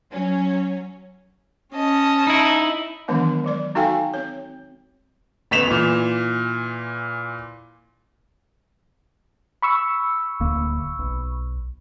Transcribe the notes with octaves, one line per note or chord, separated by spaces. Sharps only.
F#3 C#4
C#4 D#5 A5
D#4 E4
D#3 E3 F#3 G#3 B3 D4
F#3 G#3 D5
D#4 F#4 A4 F5 G5 G#5
C4 C#5
A1 B3 B6 E7 F7
A#2 E3
B5 C#6 E6
D1 D2 A#3
B1